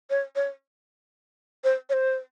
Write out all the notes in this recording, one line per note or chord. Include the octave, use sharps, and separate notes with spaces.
C#5
C#5
C5
C#5
C5